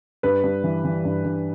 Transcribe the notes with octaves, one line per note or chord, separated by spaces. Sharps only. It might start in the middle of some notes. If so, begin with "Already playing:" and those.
G2 B4
G2
E3
E3
G2
G2